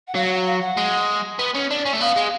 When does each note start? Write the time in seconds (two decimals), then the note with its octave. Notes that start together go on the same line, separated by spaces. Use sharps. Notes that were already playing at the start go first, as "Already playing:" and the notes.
0.07 F#5
0.15 F#3 F5
0.31 F#5
0.46 F5
0.62 F#5
0.77 G#3
1.39 B3
1.55 C#4
1.71 D4
1.85 C#4
1.93 A3
2.01 B3 F5
2.16 G#3